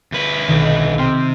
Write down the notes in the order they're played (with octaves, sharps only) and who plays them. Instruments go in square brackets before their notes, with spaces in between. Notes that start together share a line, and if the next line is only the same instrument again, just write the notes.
[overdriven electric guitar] D2 B4
[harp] B1 D#3
[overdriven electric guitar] C3 [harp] G5 C6 F6